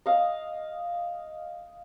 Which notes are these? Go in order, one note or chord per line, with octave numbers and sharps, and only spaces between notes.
D#5 F5